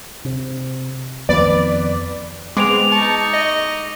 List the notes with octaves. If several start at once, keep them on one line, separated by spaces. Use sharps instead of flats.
C3
F2 D#3 F3 B3 B4 D5
G#3 B3 C4 D6 D7 F7
D#4 A5 C#6
D#5